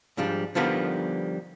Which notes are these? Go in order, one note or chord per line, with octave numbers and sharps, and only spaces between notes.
G#2 F3 G3 D4
D3 F3 G3 B3 D#4 A#4